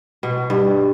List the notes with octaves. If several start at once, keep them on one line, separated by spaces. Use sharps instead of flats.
B2
G2